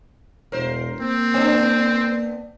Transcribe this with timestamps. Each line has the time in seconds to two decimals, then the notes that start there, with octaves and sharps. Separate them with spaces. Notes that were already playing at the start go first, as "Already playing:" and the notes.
0.52 E1 A#4 C5
1.01 A#3 C4
1.34 B3 D4